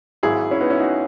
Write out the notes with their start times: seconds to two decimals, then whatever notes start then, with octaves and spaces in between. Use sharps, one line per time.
0.23 G#1 G#2 F#3 E4 G#4
0.51 C#4 E4
0.60 B3 D#4
0.70 C#4 E4
0.79 D#4 F#4